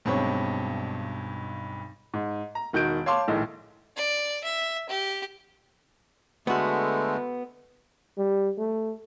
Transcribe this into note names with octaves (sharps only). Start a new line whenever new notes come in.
B1 G2 B2 G#3 C4 C#5
G#2
A#5
E1 D#3 F#4 G6 D7
C#5 F5 A5 C6 D6
A#1 A2 D#3 G#3
D5
E5
G4
D3 G#3 A3 B3 F#4
G3
A3